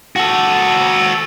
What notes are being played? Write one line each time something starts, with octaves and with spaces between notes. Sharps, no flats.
F#4 A4